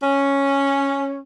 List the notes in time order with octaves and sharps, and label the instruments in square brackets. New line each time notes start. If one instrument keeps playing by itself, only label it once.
[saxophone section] C#4